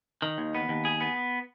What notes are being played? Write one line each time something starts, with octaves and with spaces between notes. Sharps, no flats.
D#3
D#2
B3
D#2
G#4
B3